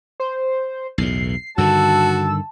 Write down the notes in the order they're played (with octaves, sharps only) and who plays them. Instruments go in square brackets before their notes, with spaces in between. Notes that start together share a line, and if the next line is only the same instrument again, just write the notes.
[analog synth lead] C5
[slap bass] B1 E2 A2 [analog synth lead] C7
[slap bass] G2 D3 D#3 [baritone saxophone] F#4 [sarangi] A5 [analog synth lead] E6